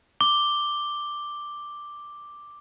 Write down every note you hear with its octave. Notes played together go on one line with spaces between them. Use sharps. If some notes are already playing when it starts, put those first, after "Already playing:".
D6 G7